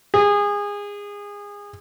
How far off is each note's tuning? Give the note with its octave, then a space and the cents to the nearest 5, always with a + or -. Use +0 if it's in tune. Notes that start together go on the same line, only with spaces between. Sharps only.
G#4 -25